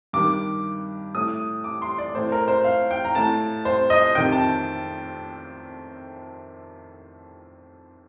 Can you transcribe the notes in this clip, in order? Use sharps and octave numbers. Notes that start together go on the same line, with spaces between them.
G2 D#3 D6
A2 D#6
D6
C6
D5
A2 C5
A#4
C5
F5
G5
A#5
A2 A5
C5
D#5
F2 C3 D#3 G5
A5